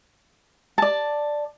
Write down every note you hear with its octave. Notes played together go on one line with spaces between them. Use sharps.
D5 A5